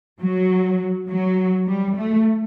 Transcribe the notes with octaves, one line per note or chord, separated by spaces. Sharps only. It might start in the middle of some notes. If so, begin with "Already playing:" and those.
F#3
F#3
G3
A3